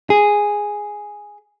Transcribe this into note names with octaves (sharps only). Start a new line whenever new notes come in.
G#4